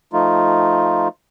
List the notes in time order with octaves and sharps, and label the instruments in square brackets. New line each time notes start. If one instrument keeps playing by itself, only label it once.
[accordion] F3 A3 D#4 F4